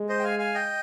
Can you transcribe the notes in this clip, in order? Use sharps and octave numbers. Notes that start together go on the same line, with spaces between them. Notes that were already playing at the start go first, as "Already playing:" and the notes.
Already playing: G#3
C5 D#5
G5
F5 G#5
F5 G#5
D#5 G5